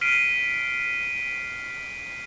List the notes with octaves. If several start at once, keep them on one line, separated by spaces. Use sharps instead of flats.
F6 B6 C7 D7 D#7